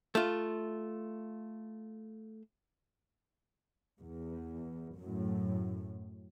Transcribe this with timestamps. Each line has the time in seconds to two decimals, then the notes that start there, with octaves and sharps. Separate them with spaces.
0.15 A3 F4
4.01 E2
4.98 F#2 A2